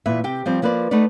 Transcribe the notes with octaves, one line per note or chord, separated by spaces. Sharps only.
E2 A#2 B4 E5
C3 G4 G5
F3 G3 C4
F3 A#3 B4 C5 D5
A3 B3 D#4 B4 D5